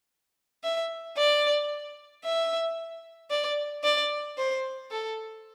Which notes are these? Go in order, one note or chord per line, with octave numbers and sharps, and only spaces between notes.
E5
D5
E5
D5
D5
C5
A4